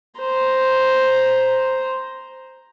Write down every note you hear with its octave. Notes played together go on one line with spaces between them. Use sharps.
C5 A#5